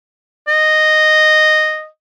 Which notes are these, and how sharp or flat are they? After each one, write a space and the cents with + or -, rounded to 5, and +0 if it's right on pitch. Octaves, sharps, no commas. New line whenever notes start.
D#5 -10